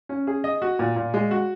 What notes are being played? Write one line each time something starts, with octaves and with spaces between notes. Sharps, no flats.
C#4
G#4
D#5
F#4
A#2
A#2
G#3
F#4